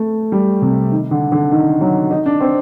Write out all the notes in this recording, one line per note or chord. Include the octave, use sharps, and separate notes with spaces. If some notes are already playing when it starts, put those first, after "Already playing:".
Already playing: A3
G3
C3
D#3
D3
D3
D#3
F#3
D#4
D4
C4